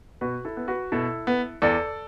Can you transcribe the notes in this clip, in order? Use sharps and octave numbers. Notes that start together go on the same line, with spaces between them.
B2 F#4 B4
E4 A4
B3
F#4 B4
B2 E4 A4
B3
E2 A4 D5